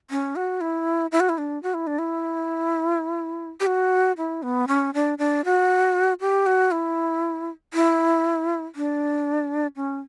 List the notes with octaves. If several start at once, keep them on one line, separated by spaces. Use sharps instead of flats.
C#4
F#4
E4
E4
F#4
E4
D4
F#4
E4
D4
E4
G4
F#4
E4
B3
C#4
D4
D4
F#4
G4
F#4
E4
E4
D4
C#4